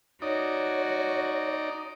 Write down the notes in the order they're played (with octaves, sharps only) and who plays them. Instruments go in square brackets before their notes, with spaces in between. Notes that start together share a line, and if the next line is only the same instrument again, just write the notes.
[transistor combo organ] D#4 D5 [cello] F#4 [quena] C#5